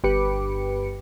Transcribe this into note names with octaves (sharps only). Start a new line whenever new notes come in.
G1 G4 B4 D6 C#7